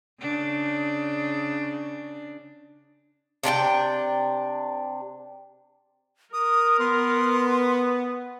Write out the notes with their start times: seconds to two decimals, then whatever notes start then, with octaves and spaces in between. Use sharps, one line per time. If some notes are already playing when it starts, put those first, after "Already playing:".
0.20 C#3 D4
3.43 C3 D4 A#4 G5
6.33 A#4 D#6
6.79 B3 C6